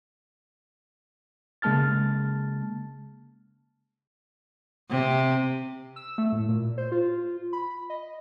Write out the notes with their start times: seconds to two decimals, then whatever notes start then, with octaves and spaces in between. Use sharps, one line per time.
1.62 C#3 G#3 A#3 A5 F6 A6
4.90 C3
5.96 E6
6.18 A3
6.32 A2
6.49 A#2
6.78 C5
6.92 F4
7.53 B5
7.90 D#5